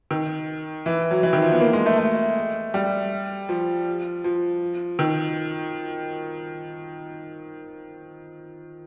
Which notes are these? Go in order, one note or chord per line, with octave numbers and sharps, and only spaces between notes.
D#3
E3
F#3
E3
D#3
F3
B3
A#3
G#3
A3
A3
G3
F3
F3
D#3